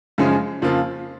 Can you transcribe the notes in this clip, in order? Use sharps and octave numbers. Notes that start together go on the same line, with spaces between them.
F#2 C#3 F3 G#3 C#4
F2 C#3 F3 A#3 F4